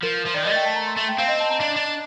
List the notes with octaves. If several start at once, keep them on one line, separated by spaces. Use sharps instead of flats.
F3 A#4
A#4
F3
D#3 D5
D#5
A3
G5
A5
A#5
C6
A3
G5
C4 F5
D#5
A5
A#5
D4
D4